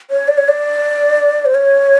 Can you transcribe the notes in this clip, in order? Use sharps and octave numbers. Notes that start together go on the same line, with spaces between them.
C#5
D5
C#5
D5
C5
C#5